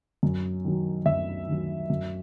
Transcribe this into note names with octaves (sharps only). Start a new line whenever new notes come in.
F#2
D#3 F#3
F#2 E5
D#3 F#3
F#2